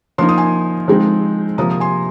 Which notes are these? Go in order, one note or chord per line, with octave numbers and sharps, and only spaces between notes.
F3 A#3 D#4 C6
D#6
G#5 C6
F3 G#3 C4 D#4
C3 F3 A#3 A#5 D#6
D#6
G#5 C6